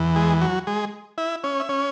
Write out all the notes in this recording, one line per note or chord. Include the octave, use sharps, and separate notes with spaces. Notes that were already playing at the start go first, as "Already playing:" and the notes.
Already playing: E2 E3
G#3 G#4
F#3 F#4
G#3 G#4
E4 E5
C#4 C#5
E5
C#4 C#5